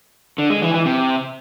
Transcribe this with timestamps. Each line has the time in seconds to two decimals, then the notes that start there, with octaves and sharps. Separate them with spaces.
0.38 D3
0.50 G#3
0.62 E3
0.74 E3
0.86 C3